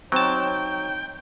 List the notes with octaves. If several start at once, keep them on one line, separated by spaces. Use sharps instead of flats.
F#3 C4 D#4 C#5 G5 A5